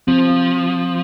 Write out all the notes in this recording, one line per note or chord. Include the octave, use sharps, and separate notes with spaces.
F3 C4
C4